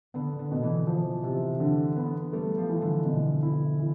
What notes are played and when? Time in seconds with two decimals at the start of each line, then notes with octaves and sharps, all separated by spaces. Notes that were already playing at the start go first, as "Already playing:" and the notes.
0.14 D3 B3
0.39 D3
0.51 B2
0.63 E3
0.87 F3
1.23 C3
1.60 D3
1.97 B3
2.33 G3 A3
2.58 F3
2.69 E3
2.81 D3
3.05 B2
3.43 E4
3.79 E3